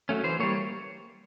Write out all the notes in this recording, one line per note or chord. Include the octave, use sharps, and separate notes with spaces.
F#3 A3 C#4
E3 C5
G3 A#3 C#5